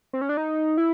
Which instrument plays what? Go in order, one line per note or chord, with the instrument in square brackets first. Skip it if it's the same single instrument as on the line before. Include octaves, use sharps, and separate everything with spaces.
[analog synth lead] C4
C#4
D4
D#4
E4